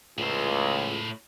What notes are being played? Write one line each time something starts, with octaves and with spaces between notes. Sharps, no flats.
C#2 A2 C5